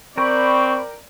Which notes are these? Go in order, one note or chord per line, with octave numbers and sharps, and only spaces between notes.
C4 A#4 D5 G5 B5 C#6